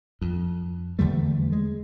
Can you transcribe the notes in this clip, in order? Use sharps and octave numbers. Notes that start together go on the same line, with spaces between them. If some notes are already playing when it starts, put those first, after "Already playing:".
F2
E2 D3 G3 A3
G#3